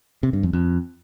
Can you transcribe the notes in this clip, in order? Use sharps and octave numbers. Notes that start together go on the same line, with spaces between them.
C3
G2
F2
F2